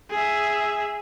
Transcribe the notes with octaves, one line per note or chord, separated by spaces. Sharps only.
G#4 E5